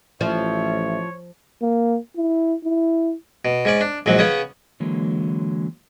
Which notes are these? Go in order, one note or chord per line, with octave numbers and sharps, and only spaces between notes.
A1 F3 C#5 E5
A#3
E4
E4
B2
G#2 C#4 D5
D4
A#1 G#2 F#3
C#3 B3 C#4 D#6
D3 E3 F#3 G#3 A#3